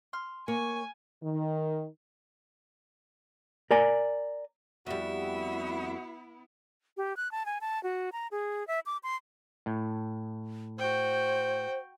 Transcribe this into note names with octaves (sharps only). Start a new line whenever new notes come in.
C6 F6
A#3 C#5 G#5
D#3
A#4 D5 G#5
F2 G3 B3 E4 F#4 E5
G4
F#6
A5
G#5
A5
F#4
A#5
G#4
E5
D6
C6
A2
F#4 C5 G5